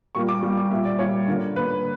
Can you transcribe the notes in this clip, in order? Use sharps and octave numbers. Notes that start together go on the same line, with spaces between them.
A#2 G3 A#3 C#6
D6
A#2 G3 A#3
D6
A#2 G3 A#3 E5
D5
A#2 G3 A#3 C#5
D3 A#3
D3 A#3 B4